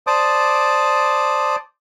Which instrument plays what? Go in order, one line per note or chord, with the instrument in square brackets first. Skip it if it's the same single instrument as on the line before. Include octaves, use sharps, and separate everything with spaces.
[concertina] C5 D5 A5 D6 D#6